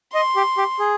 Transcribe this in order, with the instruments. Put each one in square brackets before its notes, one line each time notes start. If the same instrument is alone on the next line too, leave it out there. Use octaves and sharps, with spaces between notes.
[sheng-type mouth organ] D#5 [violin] C6
[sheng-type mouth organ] G4
G4
G#4